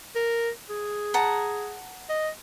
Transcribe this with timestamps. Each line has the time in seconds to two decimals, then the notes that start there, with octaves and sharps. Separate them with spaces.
0.16 A#4
0.70 G#4
1.14 F#5 A5 A#5
2.09 D#5